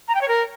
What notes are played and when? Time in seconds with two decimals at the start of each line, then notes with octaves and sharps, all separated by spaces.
0.08 A#5
0.15 G5
0.21 C#5
0.28 A#4